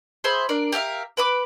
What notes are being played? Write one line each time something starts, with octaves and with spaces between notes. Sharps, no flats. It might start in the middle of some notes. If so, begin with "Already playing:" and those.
G#4 C5 E5 B5
D4 A#4 D5
G4 A#4 E5 F5
B4 B5 D6